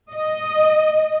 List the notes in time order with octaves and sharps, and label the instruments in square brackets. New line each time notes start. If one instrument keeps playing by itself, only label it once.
[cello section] D#5